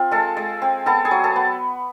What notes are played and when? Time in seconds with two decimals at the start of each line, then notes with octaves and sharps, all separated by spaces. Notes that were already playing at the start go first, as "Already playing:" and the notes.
Already playing: C4 F4
0.11 G#3 A4 A5
0.37 G#3
0.62 C4
0.86 B3 A4 A5
1.05 G#4 G#5
1.11 F#3
1.24 A4 A5
1.36 B3